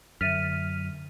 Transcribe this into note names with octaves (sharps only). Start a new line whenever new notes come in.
F#2 D3 E5 F6 A6 B6 D#7